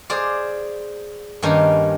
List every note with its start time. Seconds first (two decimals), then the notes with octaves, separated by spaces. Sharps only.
0.10 G#4 C5 D5 F5
1.42 G2 D#3 A#3 C#4 D#4